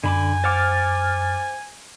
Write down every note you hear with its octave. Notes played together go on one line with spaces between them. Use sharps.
F#2 D3 G#5 B5 D6
C5 F#5 D6 F6 A6